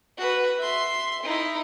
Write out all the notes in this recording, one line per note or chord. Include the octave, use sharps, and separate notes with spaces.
F#4 B4
E5 C6
D#4 E4